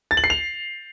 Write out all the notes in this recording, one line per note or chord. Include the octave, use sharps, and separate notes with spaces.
A6
F#7
C7
F7